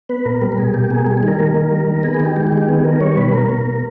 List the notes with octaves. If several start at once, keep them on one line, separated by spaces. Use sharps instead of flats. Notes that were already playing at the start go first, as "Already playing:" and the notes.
B3 B4
A#2 A#4
G3 A#4
A#4
B2 G#4
A#3 G4
B2 G#4
G3 G#4
G#4
D#3 A#4
A#3 A#4
D#3
G3
D#3
B3 G#4
G#4
D#3
G4
G#3 G4
G4
D#3
G4
B3 G#4
D#3 A#4
G3 C#5
B2 B4
A#3 A#4
B2
A#3